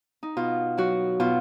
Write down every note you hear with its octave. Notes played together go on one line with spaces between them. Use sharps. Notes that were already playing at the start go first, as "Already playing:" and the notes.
D#4
B2 F4
F#3 F#4
B2 F4